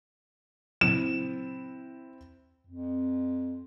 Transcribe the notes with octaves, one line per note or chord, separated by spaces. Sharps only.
A#2 C#3 F#3 C4 E4 E7
F2